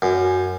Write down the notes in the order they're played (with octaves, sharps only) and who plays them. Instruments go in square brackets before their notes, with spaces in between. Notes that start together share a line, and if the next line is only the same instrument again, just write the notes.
[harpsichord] F#2